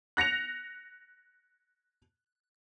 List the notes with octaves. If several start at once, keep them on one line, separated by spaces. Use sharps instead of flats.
F#6 A#6 C#7 F7